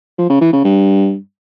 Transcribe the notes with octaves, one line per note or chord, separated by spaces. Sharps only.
F3
C#3
E3
C#3
G2